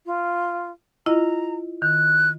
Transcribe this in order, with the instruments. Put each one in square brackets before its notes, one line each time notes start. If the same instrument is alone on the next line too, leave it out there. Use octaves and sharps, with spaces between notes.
[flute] F4
[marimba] E4 F4 D#5 [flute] A#5
[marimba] D#3 [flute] F#6